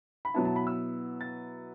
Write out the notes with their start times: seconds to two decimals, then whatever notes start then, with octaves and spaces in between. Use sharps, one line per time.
0.25 B5
0.34 B2 F#3 B3 E4 A5
0.45 A5
0.56 B5
0.67 E6
1.21 A6